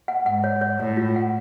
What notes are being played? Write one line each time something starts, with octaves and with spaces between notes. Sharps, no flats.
F#5
G#2 F#5
C#5
C#5
A2 C#5
F4
F#5